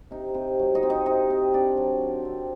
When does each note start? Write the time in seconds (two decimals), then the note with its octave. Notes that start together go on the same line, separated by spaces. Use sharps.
0.11 C3 D#4
0.34 C3
0.59 F#3
0.75 D#4 D#5
0.83 C4
0.90 D#4 D#5
1.06 C3 D#4 D#5
1.30 C4
1.53 C4 D4 D5
1.77 F#3
2.01 D#3
2.25 C4